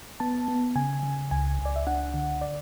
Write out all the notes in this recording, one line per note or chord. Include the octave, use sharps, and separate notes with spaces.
B3 A5
B3
C#3 G#5
C#3
C#2 G#5
C#2
D5
E5
D4 F#5
D3
D5